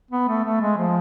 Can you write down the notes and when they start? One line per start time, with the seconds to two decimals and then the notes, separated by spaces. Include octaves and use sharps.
0.11 B3
0.28 A3
0.44 A3
0.61 G#3
0.78 F3